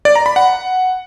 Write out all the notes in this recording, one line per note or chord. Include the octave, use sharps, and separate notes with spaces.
D5
A#5
B5
F#5